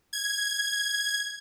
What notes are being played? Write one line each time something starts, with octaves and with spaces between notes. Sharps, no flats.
G#6